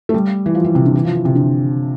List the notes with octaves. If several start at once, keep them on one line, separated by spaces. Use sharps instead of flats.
A3
G3
E3
F3
E3
C3
D3
E3
F3
E3
C3
D3